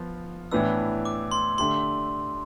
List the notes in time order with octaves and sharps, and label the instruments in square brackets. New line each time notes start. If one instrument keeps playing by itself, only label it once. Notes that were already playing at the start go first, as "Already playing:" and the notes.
Already playing: [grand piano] F3 B3 F4
[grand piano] A2 E3 B3 D4 [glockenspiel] E6
[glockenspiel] D6
C6
[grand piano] D3 A3 D4 G4 [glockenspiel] C6